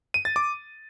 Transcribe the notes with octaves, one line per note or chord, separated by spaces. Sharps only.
D#7
A6
D6